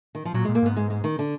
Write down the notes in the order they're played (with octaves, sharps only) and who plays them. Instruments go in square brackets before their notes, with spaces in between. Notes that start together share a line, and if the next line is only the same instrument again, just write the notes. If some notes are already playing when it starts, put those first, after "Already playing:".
[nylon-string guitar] D#3
F3
[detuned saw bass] A#2 [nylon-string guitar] F#3
[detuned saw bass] A#2 [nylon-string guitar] G#3
[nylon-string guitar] A#3
[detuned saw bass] G#2 [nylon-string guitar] B3
[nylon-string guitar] G#3
G#3
D#3
D3